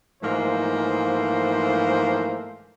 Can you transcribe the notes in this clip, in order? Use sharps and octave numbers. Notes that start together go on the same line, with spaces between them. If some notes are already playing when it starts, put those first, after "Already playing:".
G#2 E3 F3 A3 A#3 C5